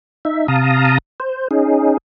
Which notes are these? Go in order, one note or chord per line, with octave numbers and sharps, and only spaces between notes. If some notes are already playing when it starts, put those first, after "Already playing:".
D#4 E5
C3 F5 A5 A#5 D#6
C5
C#4 D#4 G#4